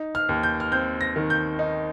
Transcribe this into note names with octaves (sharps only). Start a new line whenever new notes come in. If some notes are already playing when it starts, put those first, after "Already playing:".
Already playing: D#4
F6
D#2
G6
F6
C4 G6
A#6
D#3
G6
D#4